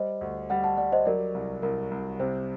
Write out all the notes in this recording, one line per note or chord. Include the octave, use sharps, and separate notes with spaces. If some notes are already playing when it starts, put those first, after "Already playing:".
Already playing: G3 C5 D#5
D2
G3 D5 F#5
F#5 A5
G3 D5 F#5
C5 D#5
F#3 A#4 D5
C2
C2 A#4
C2
C3 C5